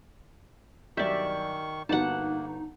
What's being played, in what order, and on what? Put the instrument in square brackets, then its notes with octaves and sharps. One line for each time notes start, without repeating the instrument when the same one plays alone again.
[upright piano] B1 G2 G6 [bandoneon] D#3 C#6 [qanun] D5 E5
[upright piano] G1 B3 F#4 [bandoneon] A#3 [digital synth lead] D#4 [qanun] F#5 A5